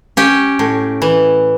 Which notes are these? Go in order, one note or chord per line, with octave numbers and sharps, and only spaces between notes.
C#4 G4
A2
E3